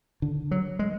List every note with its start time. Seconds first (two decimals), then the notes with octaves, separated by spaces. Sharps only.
0.22 D3
0.51 F#3
0.79 G#3